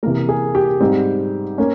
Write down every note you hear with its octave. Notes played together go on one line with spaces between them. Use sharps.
C3 E3 A#3 A#4
G#4
G4
G#2 G3 C4
A#3 C#4